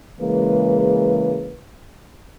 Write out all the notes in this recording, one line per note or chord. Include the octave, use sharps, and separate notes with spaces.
C#3 E3 G#3 A#3 B4